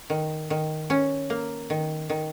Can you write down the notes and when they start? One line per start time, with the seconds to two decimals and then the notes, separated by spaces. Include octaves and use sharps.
0.10 D#3
0.50 D#3
0.90 C#4
1.30 A#3
1.70 D#3
2.10 D#3